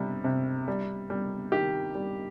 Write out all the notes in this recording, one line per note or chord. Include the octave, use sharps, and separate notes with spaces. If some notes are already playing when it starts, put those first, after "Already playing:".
Already playing: C3 G3
C3
G3
G3
D#3 G4
G3